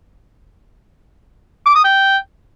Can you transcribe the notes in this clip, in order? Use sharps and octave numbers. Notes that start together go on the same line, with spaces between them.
D6
D#6
G5